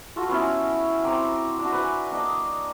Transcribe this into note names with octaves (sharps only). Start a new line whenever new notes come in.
F4 F#4 A4
B3 C#4 E4
C4 A#5 D6
D4 F#4
B4 G#5
A#3 D4 D#5